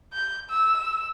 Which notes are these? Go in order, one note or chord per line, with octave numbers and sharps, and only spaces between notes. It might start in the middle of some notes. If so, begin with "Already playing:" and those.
G6
E6